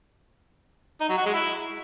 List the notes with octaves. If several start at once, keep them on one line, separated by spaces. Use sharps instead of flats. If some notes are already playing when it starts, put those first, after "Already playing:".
D#4
F#3
F#4
G#3
E4